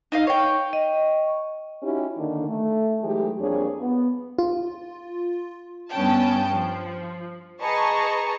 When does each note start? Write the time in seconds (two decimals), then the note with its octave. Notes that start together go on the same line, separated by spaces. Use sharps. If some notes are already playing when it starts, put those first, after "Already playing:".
0.12 D#4 D#5 F5
0.27 C#5 G5
0.73 D#5
1.83 C#4 D#4 E4 F#4 G4
2.17 D3 D#3 A#3 D4
2.48 A3
3.02 E3 F#3 G#3 A3 D#4 G4
3.39 F2 G3 A#3 D4 G#4 C#5
3.79 B3
4.38 F4
5.91 G2 B3 C#4 G5 A5
6.52 F3
7.62 G#4 B4 D#5 A5 A#5 C#6